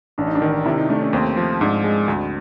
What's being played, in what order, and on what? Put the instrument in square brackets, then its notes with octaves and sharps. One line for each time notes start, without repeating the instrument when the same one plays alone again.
[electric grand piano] A1 [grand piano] D4
[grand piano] D#4
D4
[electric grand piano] D#3
[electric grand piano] C3 [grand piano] E4
[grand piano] D#4
[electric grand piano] A3 [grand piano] D4
[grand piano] C#4
[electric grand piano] D#2 [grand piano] C4
[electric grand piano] F3
[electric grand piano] G#2 [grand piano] D4
[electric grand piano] G#3
D2